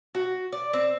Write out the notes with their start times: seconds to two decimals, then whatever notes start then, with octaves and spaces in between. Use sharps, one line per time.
0.15 F#4
0.52 D5
0.73 C4